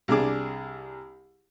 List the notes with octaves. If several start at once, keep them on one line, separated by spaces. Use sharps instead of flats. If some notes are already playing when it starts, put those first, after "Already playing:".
C2 D4 G#4 D6